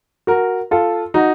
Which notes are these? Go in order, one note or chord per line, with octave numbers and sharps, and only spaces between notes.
F#4 A#4
F4 A4
D#4 F#4